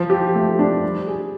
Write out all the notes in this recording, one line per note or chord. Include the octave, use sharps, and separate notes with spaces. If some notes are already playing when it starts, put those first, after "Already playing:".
Already playing: F3
G4
A3
D4
G3
G#4